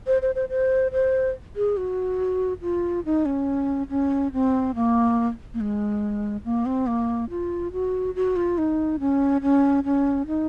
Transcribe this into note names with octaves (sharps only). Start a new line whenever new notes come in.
C5
C5
C5
C5
C5
G#4
F#4
F4
D#4
C#4
C#4
C4
A#3
A#3
G#3
A#3
C4
A#3
F4
F#4
F#4
F4
D#4
C#4
C#4
C#4
D#4